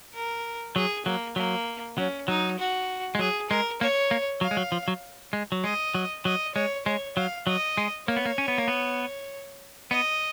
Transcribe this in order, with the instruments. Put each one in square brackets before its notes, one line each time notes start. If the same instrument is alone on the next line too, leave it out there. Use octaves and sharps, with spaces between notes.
[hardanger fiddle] A#4
[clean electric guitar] F#3 [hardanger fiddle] G#4
[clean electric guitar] F#3 [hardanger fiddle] A#3
[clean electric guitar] F#3 [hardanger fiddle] A#3
[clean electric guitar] F#3 [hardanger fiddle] C#4
[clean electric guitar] F#3 [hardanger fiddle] D#4
[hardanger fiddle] F#4
[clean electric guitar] G#3
[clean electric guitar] F#3 [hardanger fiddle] G#4
[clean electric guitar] G#3 [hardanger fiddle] A#4
[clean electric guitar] A#3 [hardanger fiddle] C#5
[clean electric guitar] A#3
[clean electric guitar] F#3 [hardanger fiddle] F5
[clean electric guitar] G#3
F#3
F3
F#3
G#3
F#3
[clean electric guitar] G#3 [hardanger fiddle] D#5
[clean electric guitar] F#3
[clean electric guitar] F#3 [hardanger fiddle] D#5
[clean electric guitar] G#3 [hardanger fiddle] C#5
[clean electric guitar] G#3 [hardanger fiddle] C#5
[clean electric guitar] F#3 [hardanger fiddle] F5
[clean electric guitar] F#3 [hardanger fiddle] D#5
[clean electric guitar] G#3
[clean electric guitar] A#3 [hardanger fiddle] C#5
[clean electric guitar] B3
A#3
C#4
B3
A#3
B3
[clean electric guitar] B3 [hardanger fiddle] D#5